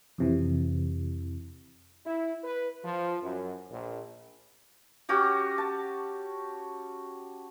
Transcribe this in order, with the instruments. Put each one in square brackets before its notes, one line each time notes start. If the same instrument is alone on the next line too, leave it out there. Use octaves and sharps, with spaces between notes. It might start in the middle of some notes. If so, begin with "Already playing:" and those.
[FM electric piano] F2 C3 E3
[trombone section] E4
B4
F3
F#2
A#1
[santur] C#4 F#4 G4
A5